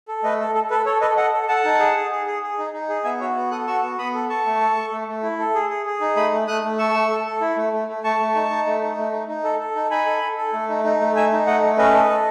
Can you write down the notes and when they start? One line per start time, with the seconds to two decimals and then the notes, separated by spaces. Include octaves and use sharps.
0.08 A4
0.23 A3 B4 D#5
0.40 A4
0.55 A4
0.70 A4 B4
0.86 A4 C#5
1.01 A4 B4 D#5
1.17 A4 D#5 F#5
1.33 A4
1.48 A4 F#5 A5
1.65 D#4
1.80 G#4
1.96 G#4
2.11 G#4
2.26 G#4
2.42 G#4
2.58 D#4
2.73 D#4
2.89 G#4
3.04 B3 E5 G#5
3.20 F#4 C#5 E5
3.36 B3
3.51 A4 D#6 F#6
3.67 F#4 C#6 E6
3.83 B3
3.98 B3 B5 D#6
4.14 A4
4.29 A4 A5 C#6
4.46 A3
4.61 A4
4.76 A4
4.92 A3
5.08 A3
5.23 E4
5.39 A4
5.55 G#4
5.70 G#4
5.86 G#4
6.01 D#4
6.16 A3 B5 D#6
6.32 A3
6.47 A3 D#6 F#6
6.63 A3
6.79 A4 C#6 E6
6.94 A3
7.11 A4
7.26 A4
7.41 E4
7.56 A3
7.73 A3
7.88 A3
8.04 A3 A5 C#6
8.19 A3
8.35 D#4
8.50 D#4
8.66 A3
8.82 D#4
8.98 A3
9.12 D#4
9.28 D#4
9.44 A4
9.60 A4
9.75 D#4
9.91 D#4 G#5 B5
10.06 A4
10.22 A4
10.37 A4
10.53 A3
10.69 D#4
10.84 D#4
11.01 A3
11.16 D#4 E5 G#5
11.32 D#4
11.46 A3 D#5 F#5
11.63 A3
11.78 C#4 B4 D#5
11.94 A4
12.09 A4